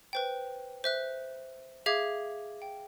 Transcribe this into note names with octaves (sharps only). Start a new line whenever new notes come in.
B4 C5 G5
C5 E5 F#6
G#4 E5 F5 D6 G#6
G5